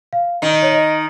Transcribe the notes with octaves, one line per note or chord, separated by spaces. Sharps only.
F5
D#3 D#4 D#5
D#5
C#5
D#5